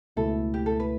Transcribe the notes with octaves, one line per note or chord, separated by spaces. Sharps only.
C#2 B2 A3 E4 A4
G4
A4
B4